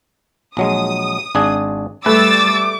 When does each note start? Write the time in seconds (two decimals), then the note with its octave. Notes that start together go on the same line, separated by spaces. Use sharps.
0.57 A#1 F#3 G#3 D#6
1.35 G#1 D4 G#4
2.06 G3 A3 B4 D6 E6 A6